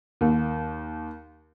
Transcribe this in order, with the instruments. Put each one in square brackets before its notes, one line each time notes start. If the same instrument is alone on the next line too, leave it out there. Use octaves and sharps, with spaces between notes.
[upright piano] D#2